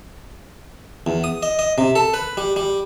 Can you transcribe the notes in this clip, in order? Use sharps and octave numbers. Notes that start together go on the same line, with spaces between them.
E2
D#6
D#5
D#5
C3
A4
B4
G3
G3